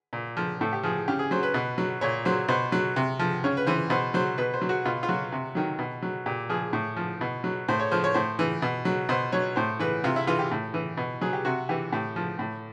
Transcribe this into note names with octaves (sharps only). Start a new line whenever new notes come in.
A#2
F3
A2 A4
G4
F3 G#4
C#3 G4
G#4
F#3 C5
B4
B2
F#3
A#2 C#5
F#3 C5
B2 C5
F#3
C3
F3
C#3 C#5
B4
E3 C5
B2 C5
F#3 C5
B2 B4
C5
F#3
F#4
B2 F4
F4
F#3 F#4
C3
D#3 F#3
B2
F#3
A#2 G4
F3 G#4
A2
F3
B2
F#3
A2 C5
C#5
F3 C5
C#5
A2 C5
E3
B2
F#3
B2 C5
F#3 C#5
A2 C5
E3 B4
C3 F4
E4
E3 F4
G4
A2
E3
B2
F#3 G#4
G4
C3 F#4
E3 G4
A2 G4
F3
A2